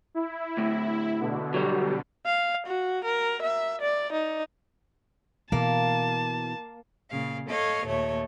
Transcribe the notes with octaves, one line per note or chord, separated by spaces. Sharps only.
E4
D2 A2
B2 D3
F#3 G3
F5
F#4
A#4
E5
D5
D#4
B2 E3 A#3 A5
A#2 C#3 F5
A4 C#5 D#5 F5
D#2 A#2 A3 C#5